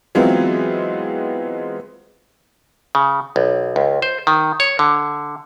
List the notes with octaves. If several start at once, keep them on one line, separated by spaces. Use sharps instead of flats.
E3 F#3 G#3 B3 C4 F4
C#3
B1
C#2
C5
D#3
C#5
D3